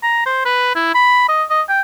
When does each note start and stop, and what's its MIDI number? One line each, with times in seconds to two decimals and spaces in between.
0.03 0.25 82
0.26 0.44 72
0.46 0.72 71
0.75 0.91 64
0.95 1.25 83
1.28 1.44 75
1.50 1.62 75
1.69 1.82 79